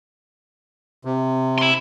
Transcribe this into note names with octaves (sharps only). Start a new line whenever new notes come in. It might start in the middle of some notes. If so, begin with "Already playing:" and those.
C3
E4 C6